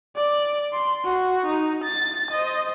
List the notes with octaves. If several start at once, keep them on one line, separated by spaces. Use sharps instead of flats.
D5
C6
F#4
D#4
A6
C5 D#5